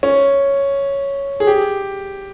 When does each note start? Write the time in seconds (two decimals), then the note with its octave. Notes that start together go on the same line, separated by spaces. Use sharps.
0.03 C#4
1.40 G#4
1.47 G4